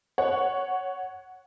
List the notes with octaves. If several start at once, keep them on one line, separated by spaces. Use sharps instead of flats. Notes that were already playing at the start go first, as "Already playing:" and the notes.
C#5 F#5